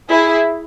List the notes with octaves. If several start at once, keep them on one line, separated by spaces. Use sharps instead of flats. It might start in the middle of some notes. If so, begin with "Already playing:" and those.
E4 G#4